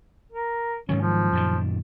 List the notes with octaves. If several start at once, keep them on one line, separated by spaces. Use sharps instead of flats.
A#4
G#2 D#3 F#3 C#4
F3
F#2 A#2 D#3